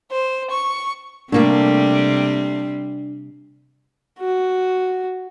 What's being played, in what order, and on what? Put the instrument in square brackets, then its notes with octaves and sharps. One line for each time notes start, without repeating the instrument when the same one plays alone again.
[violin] C5
C#6
[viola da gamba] C3 G3 C4 [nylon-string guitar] A3 A#3 A4 [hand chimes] D4
[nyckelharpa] F#4